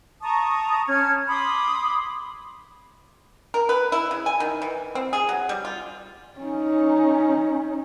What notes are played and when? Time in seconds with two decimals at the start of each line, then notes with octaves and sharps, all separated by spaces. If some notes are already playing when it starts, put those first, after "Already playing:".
0.22 A5 A#5 C#6 D#6
0.88 C#4 A5 F6 G#6
1.28 B5 C6 D6 D#6
3.54 A#4
3.69 B4
3.92 E4
4.11 C#3
4.26 G#5
4.40 D#3
4.62 E3
4.95 C4
5.13 G#4
5.29 F#3
5.49 G3
5.65 F4
6.40 C#4 D#4